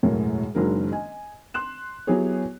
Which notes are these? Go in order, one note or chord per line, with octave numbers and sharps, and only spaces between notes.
E1 F#2 A2 A#4 C#5
F#1 D#3 F#3 G#3 D4 A#4
D#5 G#5
C6 F#6 E7
F#3 B3 E4 G4 G#4 C#5